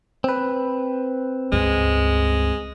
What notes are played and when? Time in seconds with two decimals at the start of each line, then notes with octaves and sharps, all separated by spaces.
0.24 C4 B4
1.52 C#2 G2 G#3